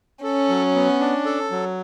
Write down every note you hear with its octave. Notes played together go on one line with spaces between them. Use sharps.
C#4 A4
F#3
B3
D4
A4
F#3